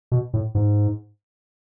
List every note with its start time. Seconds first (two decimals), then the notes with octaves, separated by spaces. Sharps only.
0.12 B2
0.34 A2
0.55 G#2